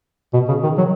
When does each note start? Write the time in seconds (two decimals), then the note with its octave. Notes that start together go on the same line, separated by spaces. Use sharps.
0.33 B2
0.48 C#3
0.63 D#3
0.78 F#3